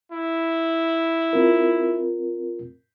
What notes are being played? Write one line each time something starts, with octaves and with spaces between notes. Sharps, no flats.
E4
C4 F4 A#4